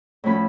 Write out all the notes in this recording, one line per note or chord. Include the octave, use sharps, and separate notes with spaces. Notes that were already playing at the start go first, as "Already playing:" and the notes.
A2 F3 A3 C#4 B5